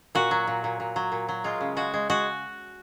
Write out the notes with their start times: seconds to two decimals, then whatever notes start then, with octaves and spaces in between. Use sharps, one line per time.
0.15 A#2 F#4
0.31 F#3
0.47 A#2
0.64 A#2
0.80 A#2
0.96 F#3
1.12 A#2
1.29 F#3
1.44 G#3 F4
1.61 C#3
1.77 G#3 F#4
1.94 G#3
2.10 G#3 F#4